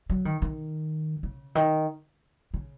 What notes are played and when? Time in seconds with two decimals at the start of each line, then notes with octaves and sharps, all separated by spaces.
0.10 F#3
0.25 D#3
0.42 D#3
1.23 C#3
1.55 D#3
2.54 C#3